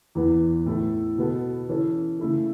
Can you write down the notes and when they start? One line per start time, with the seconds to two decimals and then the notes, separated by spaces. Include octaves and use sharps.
0.15 E2 E3 B3
0.66 A2 A3 E4 A4
1.18 B2 B3 A4
1.69 E3 C#4 A4
2.19 C#3 A3 E4 A4